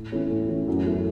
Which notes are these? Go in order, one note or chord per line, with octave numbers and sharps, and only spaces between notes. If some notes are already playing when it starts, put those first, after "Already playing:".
Already playing: A2
E3 A3 C#4
A2
E3 A3 C#4
F#2
E3 A3